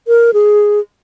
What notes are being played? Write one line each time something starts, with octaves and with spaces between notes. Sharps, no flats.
A#4
G#4